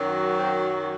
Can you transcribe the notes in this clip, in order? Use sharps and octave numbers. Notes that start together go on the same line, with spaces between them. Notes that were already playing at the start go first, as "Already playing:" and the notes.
Already playing: F#2 D#3 F#3
C4